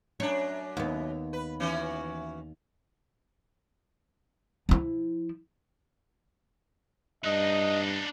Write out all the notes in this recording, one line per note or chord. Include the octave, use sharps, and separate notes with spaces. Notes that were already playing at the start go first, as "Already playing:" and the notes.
F#2 D4 C#5
D#2 B3
B4
E3 C#4 F#4
F3 E4
G2 D4 D#4 D#5